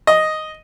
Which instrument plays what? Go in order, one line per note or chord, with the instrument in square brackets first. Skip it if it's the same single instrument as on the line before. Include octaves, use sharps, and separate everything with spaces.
[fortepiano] D#5